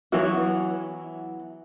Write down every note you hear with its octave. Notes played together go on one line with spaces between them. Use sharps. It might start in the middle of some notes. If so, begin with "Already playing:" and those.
E3 F#3 B3 E4 F#4